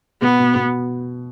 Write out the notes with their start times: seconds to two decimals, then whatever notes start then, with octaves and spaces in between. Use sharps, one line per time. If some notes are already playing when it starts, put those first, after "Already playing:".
0.22 B2 B3
0.40 B2
0.56 B2